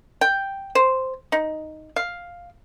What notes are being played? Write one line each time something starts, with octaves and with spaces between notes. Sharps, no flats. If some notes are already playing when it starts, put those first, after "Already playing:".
G5
C5
D#4
F5